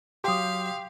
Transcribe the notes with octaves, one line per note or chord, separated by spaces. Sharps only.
F#3 G4 F5 C6 D6 D#6